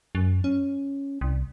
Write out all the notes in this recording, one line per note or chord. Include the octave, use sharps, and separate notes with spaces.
F#2
C#4
C2